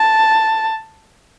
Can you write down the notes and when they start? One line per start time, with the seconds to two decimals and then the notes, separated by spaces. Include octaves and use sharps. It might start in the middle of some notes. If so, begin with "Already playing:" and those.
Already playing: A5